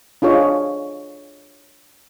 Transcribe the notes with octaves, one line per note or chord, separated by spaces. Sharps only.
D4 F4 G#4 C#5 D#5